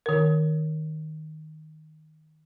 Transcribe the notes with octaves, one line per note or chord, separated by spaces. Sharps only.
D#3 A#4